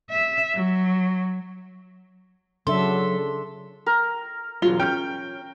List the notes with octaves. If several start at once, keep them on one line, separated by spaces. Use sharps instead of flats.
E5
F#3
C#3 F#3 D4 A4 E5 C6
A#4
E1 F#3 F4 G7
C#4 G5 F6 G6